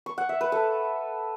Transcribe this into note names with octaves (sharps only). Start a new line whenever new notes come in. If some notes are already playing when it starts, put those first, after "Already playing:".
C#6
F#5
E5
B4
A4